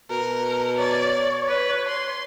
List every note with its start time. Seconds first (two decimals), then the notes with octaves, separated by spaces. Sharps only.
0.10 B2 A#4
0.77 C#5 D5
1.48 B4
1.88 C6